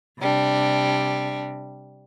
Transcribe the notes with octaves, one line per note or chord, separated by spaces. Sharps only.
C3 G3 D4